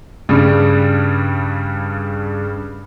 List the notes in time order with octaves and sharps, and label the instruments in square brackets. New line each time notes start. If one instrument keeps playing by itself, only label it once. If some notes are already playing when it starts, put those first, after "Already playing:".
[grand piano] G2 C#3 G3